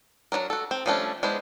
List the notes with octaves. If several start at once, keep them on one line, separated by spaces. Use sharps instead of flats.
F#3 C#4 D4 A#4
F#4 A4
C4
F3 G3 A3 C#4 D4
G#3 B3 D4 E4 C5